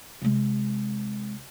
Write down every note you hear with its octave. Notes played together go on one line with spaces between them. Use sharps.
C3 G#3